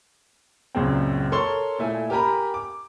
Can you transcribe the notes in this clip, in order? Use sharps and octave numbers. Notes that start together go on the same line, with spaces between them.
C#2 F#2 A#2 G#3 C4
A4 A#4 C#5 C6 C#6 G7
A#2 A3 E4 A4 G#5
G4 A#4 G#5 A#5 B5
D6